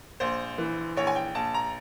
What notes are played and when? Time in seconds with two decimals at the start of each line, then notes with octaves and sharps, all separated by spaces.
0.20 A#1 C5
0.58 E3
0.97 A#1 C#5
1.07 G#5
1.16 G5
1.35 A#1 A5
1.54 A#5